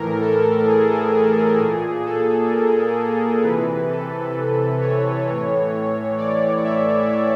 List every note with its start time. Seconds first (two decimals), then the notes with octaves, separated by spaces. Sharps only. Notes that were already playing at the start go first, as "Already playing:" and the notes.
Already playing: A2 E3 A#4
0.21 A4
0.67 G#4
1.14 G#4
1.59 A#2
2.06 A4
2.51 A#4
3.42 C3 E3 B4
3.89 A4
4.81 C#5
5.27 A2 E3
6.18 D5
6.64 E5